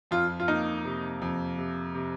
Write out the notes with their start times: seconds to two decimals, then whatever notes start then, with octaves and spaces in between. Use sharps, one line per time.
0.11 F2 F4
0.40 F4
0.48 A#3 D#4
0.85 C3
1.22 F2
1.58 C3
1.95 C3